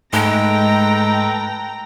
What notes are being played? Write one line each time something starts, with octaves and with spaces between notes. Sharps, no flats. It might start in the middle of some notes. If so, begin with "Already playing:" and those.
G#2 G#3 A3 A4 B4 G5 A#5